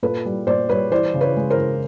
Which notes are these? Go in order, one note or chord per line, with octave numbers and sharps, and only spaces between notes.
A#2 A4 B4
G3
A#2 C5 D5
G3 B4 C#5
E3 C5 D5
C#3
B4 C#5
G#3
A#4 C5
C#3